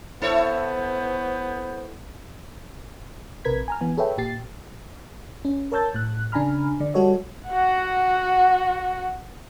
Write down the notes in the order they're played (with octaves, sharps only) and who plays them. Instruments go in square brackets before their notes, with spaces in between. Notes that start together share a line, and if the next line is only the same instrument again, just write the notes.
[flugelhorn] B3 [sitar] E4 A4 C#5 [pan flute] C5
[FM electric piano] A#1 C3 A#4 B4 G#6 B6
G#5 A#5 F6
E3 B3 G#5
G#4 A4 B4 C#5 E5 G5
A#2 G4 A6 C7
C#4
A#4 C#5 A5 E6 G6 A6
A2 F#6
C#3 D4 G#5 A#5 B5 F6
D3 D5
G3 F#4 A4 C#5 D#5
[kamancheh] F#4 F#5